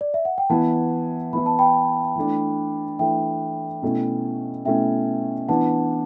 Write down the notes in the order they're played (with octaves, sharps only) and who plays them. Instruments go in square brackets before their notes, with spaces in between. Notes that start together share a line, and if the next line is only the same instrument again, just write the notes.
[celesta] D5
E5
F#5
G5
[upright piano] E3 B3 E4 [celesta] F#5 A5
[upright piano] E3 B3 E4 [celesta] B5
[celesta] A5
G5 B5
[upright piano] E3 A3 D4
[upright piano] E3 A3 D4 [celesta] E5 G5
[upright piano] B2 A3 C#4 E4
[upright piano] B2 A3 C#4 E4 [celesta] E5 G5
[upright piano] E3 B3 D4 [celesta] F#5 A5